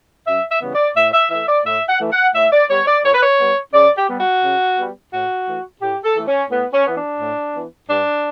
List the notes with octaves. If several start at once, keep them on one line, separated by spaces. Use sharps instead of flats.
F#2 E5
E5
C#3 E3 G3 B3
D5
A2 E5
E5
E3 A3 E5
D5
A2 E5
F#5
E3 A3
F#5
A2 E5
D5
G3 B3 C#5
D5
A2 C#5
B4
C#5
G3 B3
C#3 D5
G4
G3 B3
F#4
C#3
G3 B3
A2 F#4
E3 A3
A2 G4
A4
E3 A3
C#4
A2 B3
C#4
E3 B3
D4
A2
E3 B3
G2 D4